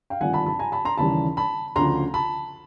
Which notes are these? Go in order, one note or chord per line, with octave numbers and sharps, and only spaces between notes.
F5 G5
G#1 G2 D3 F3 F#5 G#5
A5 B5
A5 B5
G#5 A#5
A5 B5
A#5 C6
D#2 C#3 E3 G3 A5 B5
A5 B5
D2 C#3 F3 A#5 C6
A5 B5